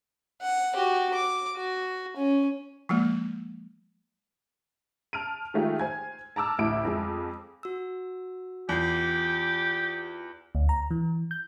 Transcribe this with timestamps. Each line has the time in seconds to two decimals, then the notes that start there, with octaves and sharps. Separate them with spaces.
0.42 F#5
0.75 F#4 G4
1.14 D6
1.56 F#4
2.17 C#4
2.89 F3 G#3 A#3
5.13 A5 F6 D7 D#7
5.54 D#3 G#3 A3 F4 G4
5.80 C5 G#5 G#6
6.36 A5 A#5 D6 E6 F6
6.58 A1 D2 E4 D7
6.85 F2 G#3
7.63 F#4 E6
8.69 E2 F4 G4 C7
10.55 D2
10.69 A#5
10.91 E3
11.31 G6